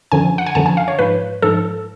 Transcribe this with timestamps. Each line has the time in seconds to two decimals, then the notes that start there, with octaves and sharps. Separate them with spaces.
0.12 F#2 D3 F3 G#5
0.38 F#5
0.46 G#5
0.55 F#2 D3 F3 A5
0.66 G#5
0.77 F5
0.88 C#5
0.99 G#2 F3 B4
1.42 G#2 F3 A4